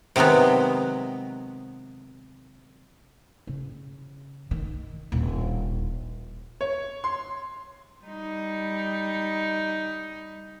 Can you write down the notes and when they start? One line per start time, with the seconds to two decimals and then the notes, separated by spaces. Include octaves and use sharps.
0.16 C3 D#3 F#3 G#3 B3
3.47 C#3
4.51 D#3
5.12 D#1 A#1
6.61 C#5
7.04 C6
8.04 G3 D#4